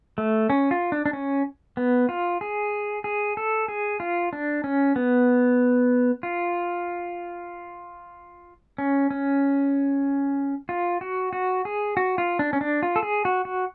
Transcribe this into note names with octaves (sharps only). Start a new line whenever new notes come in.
A3
C#4
F4
D4
D4
C#4
B3
F4
G#4
G#4
A4
G#4
F4
D4
C#4
B3
F4
C#4
C#4
F4
F#4
F#4
G#4
F#4
F4
D4
C#4
D4
F4
A4
G#4
F#4
F#4